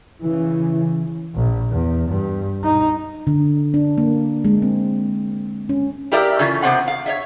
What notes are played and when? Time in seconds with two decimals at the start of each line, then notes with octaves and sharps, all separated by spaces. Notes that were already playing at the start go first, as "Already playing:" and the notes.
0.21 C#3 E3
1.35 A#1
1.72 E2
2.09 G2
2.64 D#4
3.27 D3
3.74 D4
3.98 A#3
4.45 G#3
4.62 C4
5.69 C#4
6.12 E4 G4 A#4 D5 E5 F5
6.39 C#3 E3 A3 C#4 F4
6.62 C3 E3 B3 C4 C5 F#5
6.88 F5
7.06 C#5 D#5 E5